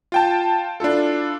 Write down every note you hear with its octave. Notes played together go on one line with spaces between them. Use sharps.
F4 G5 A5
D4 E4 F4 A4